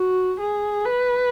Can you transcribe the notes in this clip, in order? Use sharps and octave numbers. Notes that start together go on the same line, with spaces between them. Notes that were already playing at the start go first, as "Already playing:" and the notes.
Already playing: F#4
G#4
B4